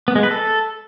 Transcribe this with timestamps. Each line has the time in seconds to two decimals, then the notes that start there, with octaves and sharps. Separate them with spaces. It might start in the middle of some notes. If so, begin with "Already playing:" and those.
0.08 B3
0.16 G#3
0.23 B4
0.31 A4